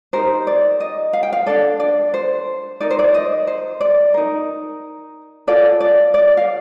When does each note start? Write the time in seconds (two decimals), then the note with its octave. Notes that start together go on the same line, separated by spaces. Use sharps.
0.13 D#4 G4 A#4 C5
0.47 D5
0.80 D#5
1.13 F5
1.23 G5
1.33 F5
1.46 D4 A4 D5
1.80 D5
2.14 C5
2.80 D#4 A#4 D5
2.91 C5
2.99 D5
3.14 D#5
3.47 C5
3.81 D5
4.14 D#4 A#4
5.47 F4 A4 D5
5.80 D5
6.14 D5
6.37 F5